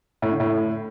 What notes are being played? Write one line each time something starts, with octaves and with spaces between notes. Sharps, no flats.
A2
D3
A2